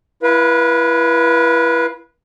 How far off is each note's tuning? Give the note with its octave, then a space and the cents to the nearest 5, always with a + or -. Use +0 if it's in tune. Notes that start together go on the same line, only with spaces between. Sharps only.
E4 +25 B4 -25 F5 +0